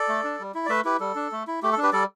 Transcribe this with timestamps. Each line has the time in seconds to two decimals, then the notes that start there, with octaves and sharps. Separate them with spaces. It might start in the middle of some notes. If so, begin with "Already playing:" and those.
Already playing: A4 D5
0.09 A3
0.24 D4
0.39 G3
0.54 E4
0.66 D5
0.69 A3 B4 E5
0.85 E4 G4 B4
1.00 G3 A4
1.15 D4
1.32 A3
1.47 E4
1.63 A3 G4
1.73 A4
1.78 D4
1.83 G4 B4
1.93 G3 A4 D5